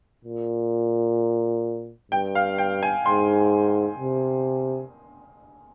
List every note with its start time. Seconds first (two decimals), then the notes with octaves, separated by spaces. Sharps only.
0.24 A#2
2.12 G2 G5
2.35 F5
2.58 G5
2.83 G#5
3.05 G#2 C6
3.99 C3